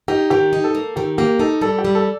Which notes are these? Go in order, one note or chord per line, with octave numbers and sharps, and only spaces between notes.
D#4 G4
D#3 G4
D#4
A4
A#3
D#3 G4
A#3 G4
D#4 A4
G3 A4
G4
G3
A4